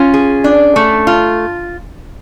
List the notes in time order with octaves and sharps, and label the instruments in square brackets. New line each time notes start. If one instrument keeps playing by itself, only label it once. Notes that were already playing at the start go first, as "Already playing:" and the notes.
Already playing: [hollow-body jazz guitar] C#4 [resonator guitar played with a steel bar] F4
[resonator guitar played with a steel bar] G#4
D4
A3
F4